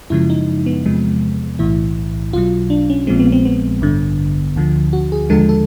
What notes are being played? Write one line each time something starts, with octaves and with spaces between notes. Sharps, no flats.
F#2 C#3 F3 G#3 E4
D#4
B3
E2 C3 F3 G#3
B1 A2 E3 E4
B1 B2 F#3 F4
D4
C#4
A#1 A#2 F3 G#3 C4
B3
C4
B3
A1 G2 D3
D2 D3 F3
F#4
G#4
D#2 D3 F3 G#3 A4
A4